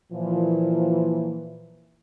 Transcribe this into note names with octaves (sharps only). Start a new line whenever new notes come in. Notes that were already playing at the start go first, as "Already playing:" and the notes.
A#2 E3 F3